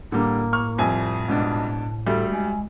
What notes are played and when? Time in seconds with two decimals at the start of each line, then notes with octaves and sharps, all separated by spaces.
0.12 A2 D3 G3 A#3
0.53 C#6 F6
0.78 C2 F2 C4 G#5
1.28 G#2 B2 D4 A5
2.06 D2 G3 A4
2.32 G#3 G#5